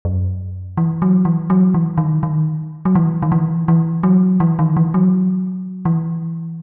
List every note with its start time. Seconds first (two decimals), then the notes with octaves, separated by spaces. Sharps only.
0.05 F#2
0.77 E3
1.02 F#3
1.25 E3
1.50 F#3
1.74 E3
1.98 D#3
2.23 D#3
2.85 F#3
2.95 E3
3.22 D#3
3.32 E3
3.68 E3
4.03 F#3
4.40 E3
4.59 D#3
4.77 E3
4.94 F#3
5.85 E3